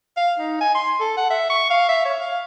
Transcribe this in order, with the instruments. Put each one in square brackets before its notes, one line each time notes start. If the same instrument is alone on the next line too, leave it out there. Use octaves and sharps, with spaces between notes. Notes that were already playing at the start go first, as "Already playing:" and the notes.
[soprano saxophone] F5
D#4
G#5
C6
A4
F#5
E5
C#6
F5
E5
C#5
F5